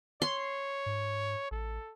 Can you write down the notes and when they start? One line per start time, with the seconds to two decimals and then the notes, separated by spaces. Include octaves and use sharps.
0.22 C#5 C6
0.86 G#2
1.51 A1 A4